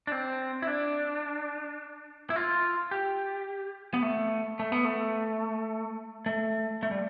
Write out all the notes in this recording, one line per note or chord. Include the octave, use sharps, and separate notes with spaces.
D4
C4
E4
D4
E4
F4
G4
B3
A3
A3
B3
A3
A3
A3
G3